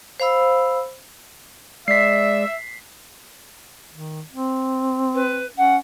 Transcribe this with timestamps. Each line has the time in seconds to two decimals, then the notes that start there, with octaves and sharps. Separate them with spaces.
0.20 C5 F5 B5 E6
1.88 G#3 D5 E5 B6 C7
3.91 D#3
4.32 C4
5.14 B4
5.57 C#4 F#5